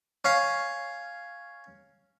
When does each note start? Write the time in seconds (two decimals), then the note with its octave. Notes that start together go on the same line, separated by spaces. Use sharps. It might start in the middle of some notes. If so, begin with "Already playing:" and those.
0.25 C#4 F5